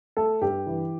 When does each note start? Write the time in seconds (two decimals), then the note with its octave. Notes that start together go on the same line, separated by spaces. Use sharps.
0.17 A3 A4
0.41 G2 G4
0.67 E3